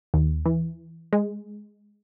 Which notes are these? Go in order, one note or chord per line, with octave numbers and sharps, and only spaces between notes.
D#2
E3
G#3